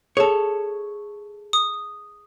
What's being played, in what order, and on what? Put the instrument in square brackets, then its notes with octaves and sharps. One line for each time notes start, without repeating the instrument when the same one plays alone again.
[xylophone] G#4 [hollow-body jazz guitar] A4 C#5
[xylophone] D#6